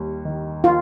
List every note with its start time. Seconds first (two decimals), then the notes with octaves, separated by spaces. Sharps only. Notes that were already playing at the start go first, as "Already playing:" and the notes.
Already playing: D#2 G3
0.25 D#3
0.64 F4